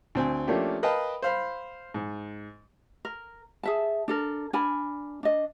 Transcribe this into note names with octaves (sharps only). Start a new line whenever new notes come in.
D2 C4 G#5
F3 A3 A#3 C#4 D4 G4
A#4 B4 D#5 F5 G5 A5
C5 F5 B5
G#2
A#4
G#4 E5 A5
D4 A4 A#4
D4 A#4 G#5 B5
D4 D#5